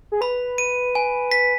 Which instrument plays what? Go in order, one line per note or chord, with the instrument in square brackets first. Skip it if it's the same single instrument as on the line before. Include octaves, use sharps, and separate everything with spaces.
[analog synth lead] G#4
[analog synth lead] B4 [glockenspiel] B5
[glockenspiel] D#7
G#5
B6